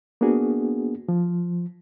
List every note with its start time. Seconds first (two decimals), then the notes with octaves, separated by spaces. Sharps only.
0.21 A#3 B3 D4 F#4 G#4
1.09 F3